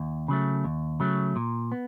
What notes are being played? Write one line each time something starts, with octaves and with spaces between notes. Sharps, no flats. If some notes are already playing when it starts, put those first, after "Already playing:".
Already playing: D#2
C#3 F#3 A3
D#2
C#3 F#3 A3
A#2
B3